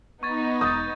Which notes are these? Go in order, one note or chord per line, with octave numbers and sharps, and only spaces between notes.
B3 D#4 C#6 G#6 A6
E1 D#6 G6 A6